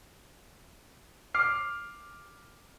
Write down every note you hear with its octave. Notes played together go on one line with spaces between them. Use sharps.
D6 F6 C7